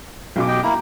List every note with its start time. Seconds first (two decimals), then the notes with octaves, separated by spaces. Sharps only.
0.36 B1 B2 D6
0.48 G4 D#5 G5
0.63 A#3 E4 A#5